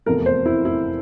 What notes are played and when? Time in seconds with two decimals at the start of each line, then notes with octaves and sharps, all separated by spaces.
0.06 F1 E2 C3 F3 A3 A#4
0.26 C5
0.46 E4
0.65 E4